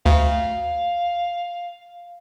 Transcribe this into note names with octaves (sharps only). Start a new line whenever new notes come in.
D2 F5